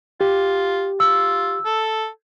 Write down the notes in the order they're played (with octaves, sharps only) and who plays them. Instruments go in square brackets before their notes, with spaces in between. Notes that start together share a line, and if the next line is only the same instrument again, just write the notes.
[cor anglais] F4 [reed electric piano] G4
[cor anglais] F4 [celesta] E6
[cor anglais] A4